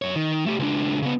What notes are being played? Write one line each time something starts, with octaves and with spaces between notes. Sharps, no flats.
F#2 C#5
D#3
A3 G4
C#2 D4
C#3 B3